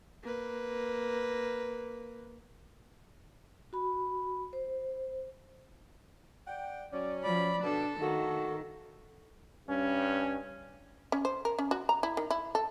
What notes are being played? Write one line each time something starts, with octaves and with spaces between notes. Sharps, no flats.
A#3 B4
F#4 B5
C5
D5 F#5 G5
F#3 C#4 D5
F3 D5 B5
B2 D3 D4 A4
D#3 A3 A#3 F#4 A4
G2 C#4
C#4
C5
A#4
C#4
F#4
A#5
E4
D#3
E4
A4